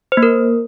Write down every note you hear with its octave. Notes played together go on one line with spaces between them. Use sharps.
C5
A#3
A#4